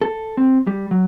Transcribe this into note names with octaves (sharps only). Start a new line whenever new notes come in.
A4
C4
G3
F#3